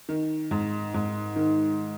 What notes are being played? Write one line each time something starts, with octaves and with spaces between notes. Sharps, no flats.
D#3
G#2
G#2
D#3